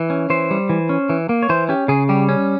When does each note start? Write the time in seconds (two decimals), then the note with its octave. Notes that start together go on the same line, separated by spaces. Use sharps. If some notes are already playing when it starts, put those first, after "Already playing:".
Already playing: E3
0.10 C#4
0.30 E3 C5
0.51 G3
0.69 E3
0.89 C#4
1.09 E3
1.29 A#3
1.43 C#5
1.49 E3 C5
1.69 C#4 G4
1.88 C#3 G#4
2.09 G3 G4
2.29 C#4